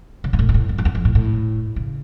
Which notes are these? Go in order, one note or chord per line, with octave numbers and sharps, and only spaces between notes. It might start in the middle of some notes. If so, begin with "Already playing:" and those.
C#3
G2
A2
A#2
A2
G2
F2
E2
F2
A2
A2
C#3